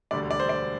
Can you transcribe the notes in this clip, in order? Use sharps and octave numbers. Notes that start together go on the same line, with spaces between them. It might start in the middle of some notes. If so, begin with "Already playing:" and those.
E1 D2 D3 G3 D5
D5
C5
D5